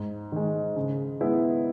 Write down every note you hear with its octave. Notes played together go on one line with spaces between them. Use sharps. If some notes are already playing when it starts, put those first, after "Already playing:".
Already playing: G#2
D#3 G#3
C#3
G#3 B3 E4